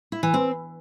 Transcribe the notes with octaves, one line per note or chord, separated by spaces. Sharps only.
E4
E3
C4